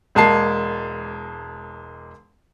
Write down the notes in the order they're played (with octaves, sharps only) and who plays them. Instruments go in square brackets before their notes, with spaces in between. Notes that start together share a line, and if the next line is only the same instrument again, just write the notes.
[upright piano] E1 G#3 A#3 A5 C7